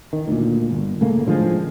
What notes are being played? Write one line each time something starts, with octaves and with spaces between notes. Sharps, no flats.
D#3
D2 A#2
G1
A2 C#3 A3 A#3
A2 D3 F3 G#3